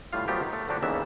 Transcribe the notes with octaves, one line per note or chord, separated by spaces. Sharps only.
A2 G3 F4 F5
F3 F#3 A3 B3 F4 G4
D#3
A3
D3 F3 F#3 D4 F#4 G4
D#2 C#3 E3 B3 E5